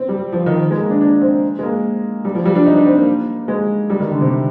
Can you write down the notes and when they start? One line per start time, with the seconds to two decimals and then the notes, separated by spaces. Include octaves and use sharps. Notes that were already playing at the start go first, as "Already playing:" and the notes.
Already playing: C4
0.09 G3
0.32 F3
0.46 D#3
0.71 G#3
0.80 A#3
0.90 D4
1.01 D4
1.21 C4
1.59 G#3
1.63 A#3
2.25 G3
2.35 F3
2.45 G3
2.55 D4
2.66 D#4
2.76 D4
2.87 C4
2.97 A#3
3.48 G#3
3.90 G3
4.00 D#3
4.10 D3
4.21 C3